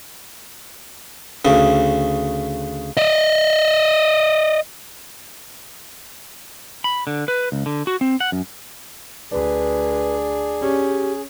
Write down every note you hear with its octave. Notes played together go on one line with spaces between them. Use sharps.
D2 C#3
D5 D#5
B5
D3
B4
C#2
D3
F#4
C4
F#5
F#2
D2 D4 G#4 B4
C#4 G4